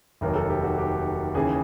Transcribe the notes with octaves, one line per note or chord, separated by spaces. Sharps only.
F1 D#2 D#3 F#3 A#4
A4
G4
F#4
G4
D#2 C#3 E3 G#4